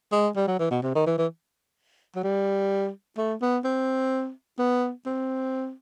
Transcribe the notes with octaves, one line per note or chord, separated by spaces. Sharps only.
G#3
G3
F#3
E3
B2
C3
D#3
E3
E3
F#3
G3
A3
B3
C4
B3
C4